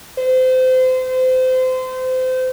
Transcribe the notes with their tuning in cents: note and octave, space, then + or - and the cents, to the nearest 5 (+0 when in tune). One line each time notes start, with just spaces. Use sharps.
C5 -30